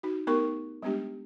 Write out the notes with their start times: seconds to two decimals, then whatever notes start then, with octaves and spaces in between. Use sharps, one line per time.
0.03 D#4 F#4
0.27 A3 B3 D#4 G4 A#4 C#6
0.82 G3 G#3 B3 D4 G4